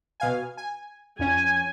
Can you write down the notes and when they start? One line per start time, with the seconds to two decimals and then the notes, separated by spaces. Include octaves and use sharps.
0.20 B2 F5 G#5
0.57 G#5
1.19 F2 C#4 G#5